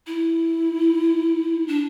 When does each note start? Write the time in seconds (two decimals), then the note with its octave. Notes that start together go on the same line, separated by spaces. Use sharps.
0.07 E4
1.68 D4